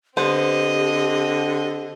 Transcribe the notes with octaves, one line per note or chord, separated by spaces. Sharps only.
D3 B3 C4 G4 C5 D#5